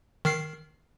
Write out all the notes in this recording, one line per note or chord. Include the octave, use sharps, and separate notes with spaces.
D#3 F6 C7